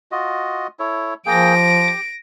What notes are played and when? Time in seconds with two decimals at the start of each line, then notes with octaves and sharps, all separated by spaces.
0.12 F4 F#4 D#5
0.79 E4 A4 C#5
1.26 F3 A#3 G#4 G5 A#6 D7
1.55 G4